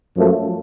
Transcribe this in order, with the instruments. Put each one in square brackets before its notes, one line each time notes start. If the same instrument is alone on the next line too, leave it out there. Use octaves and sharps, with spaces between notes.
[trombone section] F#2 F3 A3